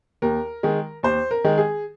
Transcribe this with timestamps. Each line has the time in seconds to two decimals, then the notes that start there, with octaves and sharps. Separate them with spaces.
0.22 D#2 A#4
0.63 D#3 G#3
1.03 D#2 C5
1.31 A#4
1.44 D#3 G#3
1.58 G#4